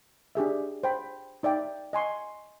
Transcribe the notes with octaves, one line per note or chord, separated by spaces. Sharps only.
D4 G4 G#4 E5
C5 G5 B5
D#4 D5 E5 G5
D#5 G#5 C6 C#6